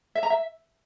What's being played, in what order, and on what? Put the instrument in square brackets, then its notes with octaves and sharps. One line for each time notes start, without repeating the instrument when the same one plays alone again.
[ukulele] E5
A#5
E5